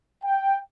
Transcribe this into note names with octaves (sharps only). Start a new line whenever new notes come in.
G5